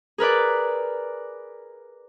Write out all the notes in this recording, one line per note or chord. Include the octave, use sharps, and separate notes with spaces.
G#4 A#4 B4 D5